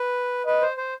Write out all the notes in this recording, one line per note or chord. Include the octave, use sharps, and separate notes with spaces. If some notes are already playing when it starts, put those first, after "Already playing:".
Already playing: B4
B4 D#5
C5
C5